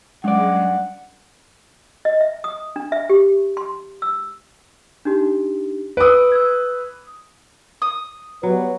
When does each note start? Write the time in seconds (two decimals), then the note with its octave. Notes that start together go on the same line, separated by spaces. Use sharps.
0.24 G2 F#3 G#3 C#4 D5 F#5
2.05 D#5
2.21 E5
2.44 D#6
2.76 D4
2.92 E5
3.10 G4
3.57 C6
4.02 E6
5.05 D4 D#4 G4
5.97 B4 D#6 E6 D7
6.32 E6 G#6
7.82 D#6
8.43 F#3 G3 B3 B4